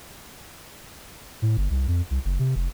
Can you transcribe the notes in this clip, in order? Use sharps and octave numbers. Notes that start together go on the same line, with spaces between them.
A2
G1
C2
F2
C2
F#1
C3
F1